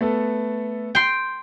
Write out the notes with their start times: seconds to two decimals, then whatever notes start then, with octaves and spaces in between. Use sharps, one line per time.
0.01 A3 B3 A4
0.95 G5 C6